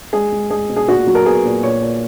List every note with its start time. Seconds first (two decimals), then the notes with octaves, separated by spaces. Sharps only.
0.13 G#3 G#4
0.32 G#3
0.50 G#3 G#4
0.69 B2
0.76 G#4
0.88 A#2 F#4
1.07 F#3
1.15 A#4
1.26 B3 G#4
1.45 A#2
1.63 A#2 C#5
1.82 A#2